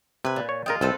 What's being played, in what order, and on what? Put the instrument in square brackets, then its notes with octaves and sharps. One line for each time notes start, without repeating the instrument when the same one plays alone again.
[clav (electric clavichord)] C3 [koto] B4 G#5
[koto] A#2
[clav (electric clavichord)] C#5
[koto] G#3 F4 [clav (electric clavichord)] A#4 G5
[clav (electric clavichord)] C2 [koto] C4 A4 B4